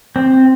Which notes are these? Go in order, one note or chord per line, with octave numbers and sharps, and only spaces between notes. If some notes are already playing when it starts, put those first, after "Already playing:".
C4